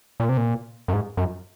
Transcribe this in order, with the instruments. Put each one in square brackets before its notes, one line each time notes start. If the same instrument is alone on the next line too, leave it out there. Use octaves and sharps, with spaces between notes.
[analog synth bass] A#2
C3
A#2
F#2
G#2
F#2